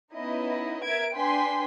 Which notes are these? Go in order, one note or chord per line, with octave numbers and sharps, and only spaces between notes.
B3 C#4 D#4 E4 D#5
A#4 E5 G#6 D7
D4 B4 G5 G#5 C6 B6